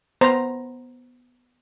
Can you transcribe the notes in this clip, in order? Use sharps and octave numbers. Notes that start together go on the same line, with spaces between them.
B3 C5 A#5